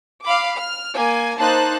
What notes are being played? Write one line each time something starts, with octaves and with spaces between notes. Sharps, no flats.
F5 B5 D6
F6
A#3 G#5
A#3 D#4 C5 A5 F#6